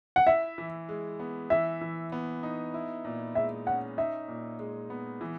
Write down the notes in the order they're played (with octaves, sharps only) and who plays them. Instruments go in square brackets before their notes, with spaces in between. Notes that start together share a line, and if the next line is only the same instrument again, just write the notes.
[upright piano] F#5
[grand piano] E4 [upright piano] E5
[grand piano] E3
G#3
B3
[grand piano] E3 [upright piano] E5
[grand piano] E3
B3
D#4
E4
A#2
[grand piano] G#3 [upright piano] E5
[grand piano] C#4 [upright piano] F#5
[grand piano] D#4 [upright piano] E5
[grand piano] A#2
G#3
B3
E3